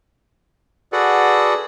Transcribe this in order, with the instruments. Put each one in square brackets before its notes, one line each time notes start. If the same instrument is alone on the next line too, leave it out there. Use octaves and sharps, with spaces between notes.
[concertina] F#4 G#4 A4 B4 D5 F#5